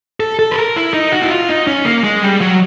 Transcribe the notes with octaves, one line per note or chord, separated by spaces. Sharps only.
A4
A4
B4
A#4
E4
D#4
F#4
E4
F4
D#4
C#4
A#3
G#3
G3
F#3